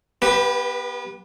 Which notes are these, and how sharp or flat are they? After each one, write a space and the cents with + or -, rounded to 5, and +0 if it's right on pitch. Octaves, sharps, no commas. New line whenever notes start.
B3 -35 G4 +5 B4 +0